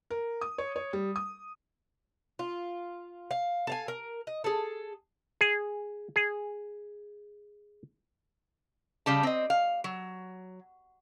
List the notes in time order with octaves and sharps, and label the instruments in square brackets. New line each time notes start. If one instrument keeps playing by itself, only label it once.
[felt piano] A#4
D#6
C#5
C#5
G3
D#6
[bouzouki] F4
F5
A4 F5 G#5
A#4
D#5
G#4 A4
[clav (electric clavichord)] G#4
G#4
[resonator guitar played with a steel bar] C#3 G3 G4 A5
C4 D#5
F5
F#3